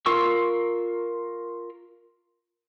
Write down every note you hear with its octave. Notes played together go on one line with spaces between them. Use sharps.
F4 A#4 C6 C#6 E6